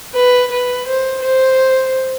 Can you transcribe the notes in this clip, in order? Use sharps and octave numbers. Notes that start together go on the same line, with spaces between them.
B4
B4
C5
C5